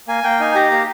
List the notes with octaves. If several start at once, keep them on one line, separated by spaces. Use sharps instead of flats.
A#3 G#5
A#3 G5
D#4 G#5
G4 A#5
A#3